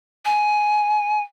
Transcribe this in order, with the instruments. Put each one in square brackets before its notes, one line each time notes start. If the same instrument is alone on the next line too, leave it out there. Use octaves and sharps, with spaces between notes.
[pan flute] G#5